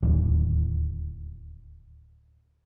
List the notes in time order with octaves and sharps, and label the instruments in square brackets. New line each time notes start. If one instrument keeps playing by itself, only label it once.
[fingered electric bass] D1 D#2